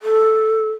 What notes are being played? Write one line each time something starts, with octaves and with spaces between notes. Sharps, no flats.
A4